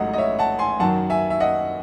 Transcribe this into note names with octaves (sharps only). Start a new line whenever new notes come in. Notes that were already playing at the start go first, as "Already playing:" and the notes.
Already playing: A1 G#2 F#3 A3 D#5 F#5
D#5
C#5 E5
F#5 A5
G#5 C6
F#2 D#3 F#3 F#5 A5
E5 G#5
E5
D#5 F#5